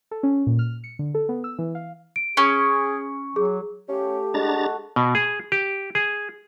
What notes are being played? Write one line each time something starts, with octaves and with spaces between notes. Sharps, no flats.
A4
C#4
A#2
F6
C#7
D3
A4
B3
E6
E3
F5
D7
C#4 G#4
F#3 G#4
A3 C#4 G4 F5
G#3 D4 F#4 A4 B4 A#5 A6
B2
G#4
G4
G#4